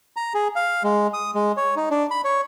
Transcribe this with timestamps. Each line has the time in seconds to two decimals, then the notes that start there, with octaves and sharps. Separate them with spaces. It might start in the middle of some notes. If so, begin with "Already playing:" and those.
0.16 A#5
0.34 G#4
0.56 F5
0.84 G#3
1.13 D#6
1.35 G#3
1.57 C#5
1.76 D#4
1.91 D4
2.11 B5
2.24 C#5